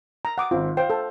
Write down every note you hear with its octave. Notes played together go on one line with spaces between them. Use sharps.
A#5
F#5 D6 D#6
G#1 C4 F4
C5 F5 G5
A4